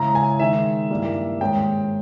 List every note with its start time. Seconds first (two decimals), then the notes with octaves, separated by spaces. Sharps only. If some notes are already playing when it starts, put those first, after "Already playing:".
Already playing: C#3 E3 G#3 C#4 E4 A#5
0.15 G#5
0.39 D#3 G#3 D#4 E5
0.90 G2 E3 G3 A#3
1.40 G#2 D#3 G#3 C#4 G5